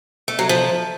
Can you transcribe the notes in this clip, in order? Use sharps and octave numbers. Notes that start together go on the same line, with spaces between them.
A3
F#3
F3